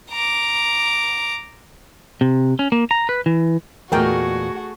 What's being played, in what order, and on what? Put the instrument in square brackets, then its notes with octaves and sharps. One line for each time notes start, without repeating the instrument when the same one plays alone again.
[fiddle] A#5 D6
[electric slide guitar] C3
C#4
A#3
A#5
B4
E3
[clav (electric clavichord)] E2 A#2 [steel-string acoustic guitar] A3 G#4 D#5 [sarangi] F#4 [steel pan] A#4 G5